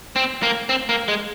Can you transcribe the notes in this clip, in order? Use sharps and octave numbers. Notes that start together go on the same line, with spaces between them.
C4
A#3
C4
A#3
G#3